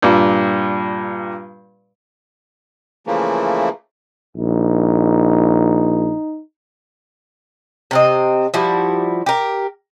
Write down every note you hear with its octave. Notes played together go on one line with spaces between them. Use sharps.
G2 A#2
C#3 E3 F3 A3 A#3
A#1 D#4
C3 C4 D#5
F3 G3 E4 F#4
G4 A#4